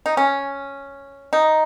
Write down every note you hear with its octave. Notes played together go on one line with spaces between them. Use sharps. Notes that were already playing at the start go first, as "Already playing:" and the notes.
D#4
C#4
D#4